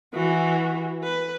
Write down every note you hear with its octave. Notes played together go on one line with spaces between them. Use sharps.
E3 F#4
B4